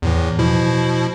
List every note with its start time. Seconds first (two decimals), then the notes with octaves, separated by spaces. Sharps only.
0.02 E2 A2 E3
0.39 B2 F3 E4